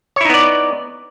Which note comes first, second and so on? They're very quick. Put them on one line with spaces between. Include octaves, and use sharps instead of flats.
C#5 E4 D#4 B3 D5